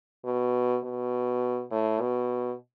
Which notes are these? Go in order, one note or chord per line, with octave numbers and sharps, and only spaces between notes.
B2
B2
A2
B2